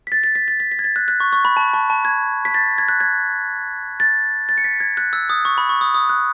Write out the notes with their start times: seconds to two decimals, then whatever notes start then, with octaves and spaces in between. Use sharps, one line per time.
0.07 B6
0.12 A6
0.24 A6
0.35 B6
0.48 A6
0.60 B6
0.72 B6
0.79 G#6
0.84 A6
0.96 F#6
1.08 F#6
1.20 C#6
1.33 C#6
1.45 B5
1.57 A5
1.74 A5
1.90 A5
2.05 G#6
2.45 B6
2.54 A6
2.78 G#6
2.89 F#6
3.00 G#6
4.00 A6
4.49 A6
4.58 C#7
4.64 B6
4.80 G#6
4.97 F#6
5.13 E6
5.30 D#6
5.45 C#6
5.58 B5
5.69 C#6
5.81 D#6
5.94 D#6
6.09 F#6